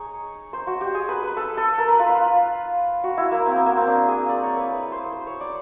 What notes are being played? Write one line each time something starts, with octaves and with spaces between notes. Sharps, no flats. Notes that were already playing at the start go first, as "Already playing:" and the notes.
Already playing: D#4 G#4 C#5
C5
F#4
G4
G#4
B4
B4
A4
A4
A#4
B4
F4
F4
F#4
E4
A#3
C4
B3
A#3
C4
D4
G#4
D5
C#5
B4
B4
C5
C5
C#5
D5